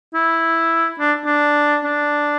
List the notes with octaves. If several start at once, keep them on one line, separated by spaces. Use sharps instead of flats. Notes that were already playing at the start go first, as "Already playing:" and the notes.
E4
D4
D4
D4